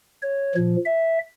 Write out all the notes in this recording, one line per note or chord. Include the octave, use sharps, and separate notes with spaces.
C#5
A#2 F3
E5